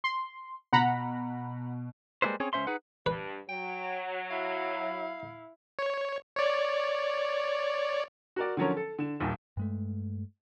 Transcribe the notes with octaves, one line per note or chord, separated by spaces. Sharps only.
C6
B2 F#5 A#5 B5
G3 G#3 A#3 E4 B4 C5
C4 C#4 G#4 C#5
C#2 G#3 C#4 C5 E5 C6
D#4 G#4 B4 F#5
G2 B4
F#3 G5
E4 F5
C#5
C#5 D5
F#4 A#4 D5
D3 F3 F#3 C#4 A#4 C#5
A4
D3 E7
D#1 A#1 D#2
G2 G#3 A3